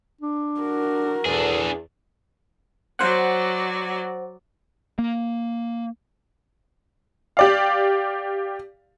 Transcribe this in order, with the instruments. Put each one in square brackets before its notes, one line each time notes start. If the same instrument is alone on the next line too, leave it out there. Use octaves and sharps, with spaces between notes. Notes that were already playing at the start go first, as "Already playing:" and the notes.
[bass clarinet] D4
[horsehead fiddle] F#4 A#4
[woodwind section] E2 [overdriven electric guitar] D4 G#4 [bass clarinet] A4
[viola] F#3 D5 [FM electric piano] C5 F#5
[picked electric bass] A#3
[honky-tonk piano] G4 D5 F5